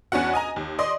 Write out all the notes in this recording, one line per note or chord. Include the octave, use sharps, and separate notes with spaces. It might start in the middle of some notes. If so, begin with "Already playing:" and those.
E2 C#4 D4 F#4 F#5
D#5 G#5 A#5
D#2
D5 D#5 C6 D#6